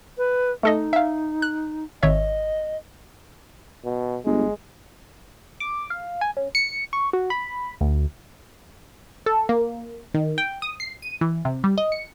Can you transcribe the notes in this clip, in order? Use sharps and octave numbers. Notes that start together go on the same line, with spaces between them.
B4
A3 D#4 A4 D#5
E5 F5
F#6
G#1 C#5 D#5 E5
B2
G1 G#3
D6
F5
G#5
C#4
C#7
C#6
F#4
B5
D2
A4
A#3
D#3
G5
D#6
C7
D#7
E3
C3
G3
D#5
C#7